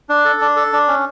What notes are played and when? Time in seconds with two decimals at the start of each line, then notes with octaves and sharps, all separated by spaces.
0.09 D4
0.25 A4
0.41 D4
0.56 A4
0.73 D4
0.88 C#4